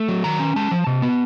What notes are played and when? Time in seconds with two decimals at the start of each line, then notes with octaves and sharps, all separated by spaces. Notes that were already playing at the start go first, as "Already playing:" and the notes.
Already playing: A3
0.09 F#3
0.24 D#3 A#5
0.39 C#4
0.56 G#3 A5
0.71 F3
0.87 C3
1.02 B3